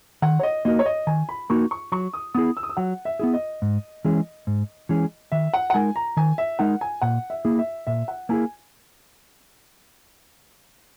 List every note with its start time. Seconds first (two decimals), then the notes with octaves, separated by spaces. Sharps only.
0.22 D#3 F#5
0.39 C#5
0.43 D#5
0.65 A#3 D#4 F#4 A#4 D#5
0.79 C#5
0.86 D#5
1.07 D#3 G#5
1.29 B5
1.50 A#3 D#4 F#4 A#4 C#6
1.71 C#6
1.92 F#3 C#6
2.14 D#6
2.34 B3 E4 G#4 D#6
2.57 E6
2.63 D#6
2.69 E6
2.77 F#3 F#5
3.05 E5
3.20 B3 E4 G#4
3.34 D#5
3.62 G#2
4.05 E3 G#3 C#4 G#4
4.47 G#2
4.89 E3 G#3 C#4 G#4
5.32 D#3 E5
5.54 F#5
5.70 F#5
5.74 G#3 D#4 A#4 G#5
5.96 A#5
6.17 D#3 G#5
6.38 E5
6.59 G#3 D#4 A#4 F#5
6.81 G#5
7.02 A#2 F#5
7.30 E5
7.45 A#3 E4 G#4
7.59 E5
7.87 A#2 E5
8.08 F#5
8.29 A#3 E4 G#4 G#5